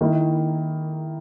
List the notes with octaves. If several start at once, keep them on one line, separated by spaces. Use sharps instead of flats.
D#3 A#3 E4